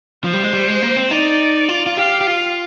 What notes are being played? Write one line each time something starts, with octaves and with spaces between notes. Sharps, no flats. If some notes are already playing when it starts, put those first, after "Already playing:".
F3 C5
G3
G#3
G3
G#3
A#3
C4
D#4 D5
F4
F4
G4 F5
G4
F4